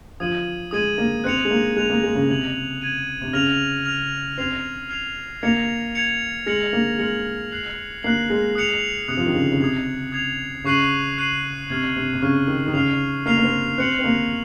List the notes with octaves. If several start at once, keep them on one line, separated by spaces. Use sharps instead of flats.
F3 D#6 G#6 D#7 F#7
G#3 D#6 G#6 D#7 F#7
A#3
C4 F#6 C#7 F7
G#3
A#3
G#3 F#6 C#7 F7
A#3
G#3
C#3
C3 G#6 D#7 F#7
G#6 D#7 F#7
C3
C#3 F6 A#6 F7
F6 A#6 F7
C4 F6 G#6 C7 F7
F6 G#6 C7 F7
A#3 G#6 C#7 F7
G#6 C#7 F7
G#3 F6 A#6 C#7 F#7
A#3
G#3 F6 A#6 C#7 F#7
F#6 C7 F#7
A#3 F#6 C7 F#7
G#3
D#6 F#6 C#7 F7
C3 D#6 F#6 C#7 F7
F3
D#3
C#3
C#3
C3 D#6 G#6 C7 F7
D#6 G#6 C7 F7
C#3 C#6 F#6 C7 D#7 F#7
C#6 F#6 C7 D#7 F#7
C3 C#6 F6 G#6
C3
C3
C#3 C#6 F6 G#6
D#3
D#3
C#3 F6 C7 F7
A#3 F6 C7 F7
A#3
C4
C4 F#6 C#7 F#7
C4
A#3